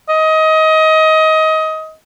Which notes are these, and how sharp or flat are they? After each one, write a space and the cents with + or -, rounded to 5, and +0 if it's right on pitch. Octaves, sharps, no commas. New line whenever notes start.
D#5 +25